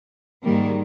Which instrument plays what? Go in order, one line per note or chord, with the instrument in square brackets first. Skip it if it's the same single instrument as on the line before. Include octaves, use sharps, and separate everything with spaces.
[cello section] G#2 D#3 G3 A#3